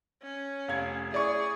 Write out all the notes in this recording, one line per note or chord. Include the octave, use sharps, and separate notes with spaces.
C#4
F1 F5 G#6
E4 G#4 D5 C#6